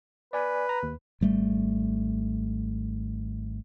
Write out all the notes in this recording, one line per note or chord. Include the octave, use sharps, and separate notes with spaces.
B4 D5 G#5
A#5
D#2
G#1 G3 A3